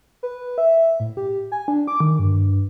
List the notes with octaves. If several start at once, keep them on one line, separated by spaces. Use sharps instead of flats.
B4
E5
A2
G4
G#5
D4
D6
D#3
G2